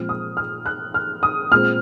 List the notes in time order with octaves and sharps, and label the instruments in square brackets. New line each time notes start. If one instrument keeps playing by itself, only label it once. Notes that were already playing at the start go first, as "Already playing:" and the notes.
Already playing: [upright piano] A#2 F3 G#3 C4 F6
D#6
F6
F#6
F6
D#6
A#2 G#3 C4 F6